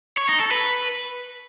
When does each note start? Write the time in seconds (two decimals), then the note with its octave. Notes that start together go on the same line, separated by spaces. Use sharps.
0.18 C#5
0.29 D#4
0.40 A4
0.51 B4